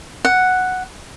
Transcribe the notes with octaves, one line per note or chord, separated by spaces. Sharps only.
F#5